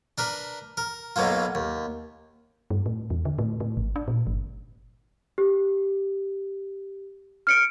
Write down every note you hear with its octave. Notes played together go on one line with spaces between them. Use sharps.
D4 A#4 B4
A#4
B1 B2 F#3 A#3 F4
D#2
G2
A2
E2
D3
A2
A2
G#1
D4
A#2
G1
G4
F6 C#7 D7